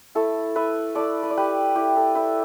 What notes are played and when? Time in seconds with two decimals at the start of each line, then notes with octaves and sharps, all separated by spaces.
0.15 A3 E4 A4
0.56 B4 E5
0.95 A3 E4 A4 D5
1.23 B4
1.31 D5
1.37 G4 B4
1.76 A3 E4 G4
1.96 A4
2.15 B4 E5